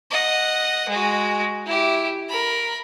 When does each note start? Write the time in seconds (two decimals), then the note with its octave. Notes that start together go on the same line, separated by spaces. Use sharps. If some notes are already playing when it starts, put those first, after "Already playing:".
0.11 D#5 F#5
0.89 G#3 F#4
1.66 E4 G4
2.29 A#4 B5